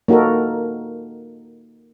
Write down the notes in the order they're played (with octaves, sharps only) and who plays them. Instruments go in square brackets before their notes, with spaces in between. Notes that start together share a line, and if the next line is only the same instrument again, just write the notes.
[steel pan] A#3 D#4 F#4 A4 A#4